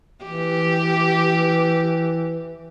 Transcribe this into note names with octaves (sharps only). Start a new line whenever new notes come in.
E3 G4